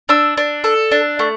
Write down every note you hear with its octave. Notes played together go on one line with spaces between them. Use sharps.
D4 E6
D4
A4
D4
A3